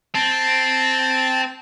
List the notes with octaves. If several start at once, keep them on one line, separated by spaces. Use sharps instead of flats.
C4 A5